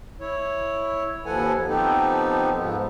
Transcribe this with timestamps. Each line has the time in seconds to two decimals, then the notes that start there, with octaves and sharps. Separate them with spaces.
0.20 E4 C#5
1.26 D#2 F3 A4 B4 F#5 G#5
1.68 F3 B3 C4 D#4 G4 A4
2.56 G#2 F3 B3